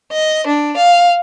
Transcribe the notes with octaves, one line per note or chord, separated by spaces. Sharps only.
D#5
D4
F5